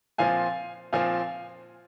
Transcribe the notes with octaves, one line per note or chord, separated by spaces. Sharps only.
A#2 F3 C4 F5 G#5
A#2 F3 C4 F5 G#5